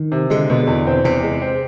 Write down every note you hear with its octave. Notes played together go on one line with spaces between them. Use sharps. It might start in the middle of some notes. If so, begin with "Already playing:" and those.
Already playing: D#3
C3
D3 G#3
B2
E2
C4
E2 C3
G#3
C4